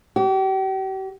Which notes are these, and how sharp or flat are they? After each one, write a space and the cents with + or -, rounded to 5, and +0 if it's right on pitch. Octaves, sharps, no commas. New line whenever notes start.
G4 -40